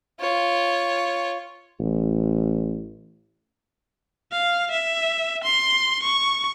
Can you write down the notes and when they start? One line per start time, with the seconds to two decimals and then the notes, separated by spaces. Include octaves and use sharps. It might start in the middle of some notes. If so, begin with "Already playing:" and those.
0.20 F4 C#5
1.79 A1
4.31 F5
4.71 E5
5.44 C6
6.03 C#6